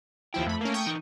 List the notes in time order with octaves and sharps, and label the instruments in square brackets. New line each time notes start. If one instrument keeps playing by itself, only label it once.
[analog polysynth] D#2 F3 E4 [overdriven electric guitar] G5
[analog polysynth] F2 B5 [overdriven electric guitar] A3
[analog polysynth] A#3 C#4
G5 C#6 D#6
[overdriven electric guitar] E3 D#4